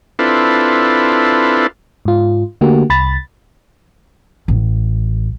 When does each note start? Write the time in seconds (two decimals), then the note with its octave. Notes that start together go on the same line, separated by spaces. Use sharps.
0.19 C4 D4 E4 F4 A4 B4
2.05 G#2 F4
2.61 D3 A3 A#3 F#4 G4
2.90 C2 B5 A6
4.48 A1